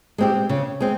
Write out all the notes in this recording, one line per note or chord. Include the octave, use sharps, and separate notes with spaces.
G#3 C4 G4
C#3
G#3 C4